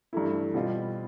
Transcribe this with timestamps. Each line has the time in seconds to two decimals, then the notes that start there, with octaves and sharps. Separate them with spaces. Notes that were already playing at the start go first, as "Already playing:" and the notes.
0.13 G2 E3 A3 E4
0.54 B2 G3 C4 F4